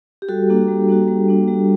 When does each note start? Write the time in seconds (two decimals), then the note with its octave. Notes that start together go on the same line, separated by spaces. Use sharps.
0.22 G4
0.29 G3 F#4 A4
0.50 A#3 D4 F#4
0.68 G3
0.89 A#3 D4 F#4
1.08 G3
1.28 A#3 D4 F#4
1.48 G3